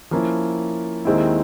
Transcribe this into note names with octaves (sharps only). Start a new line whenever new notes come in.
F3 A#3 C#4 E4
D#2 D#3 G#3 C4 E4